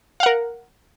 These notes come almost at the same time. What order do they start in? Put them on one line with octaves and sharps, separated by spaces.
F5 F#5 A#4